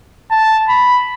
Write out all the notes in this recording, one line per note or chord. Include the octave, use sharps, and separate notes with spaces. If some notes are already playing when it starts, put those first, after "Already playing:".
A5
B5